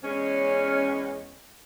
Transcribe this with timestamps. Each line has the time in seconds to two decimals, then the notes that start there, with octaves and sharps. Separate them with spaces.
0.04 E2 G#3 C#4